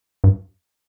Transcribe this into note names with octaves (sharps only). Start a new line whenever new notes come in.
G2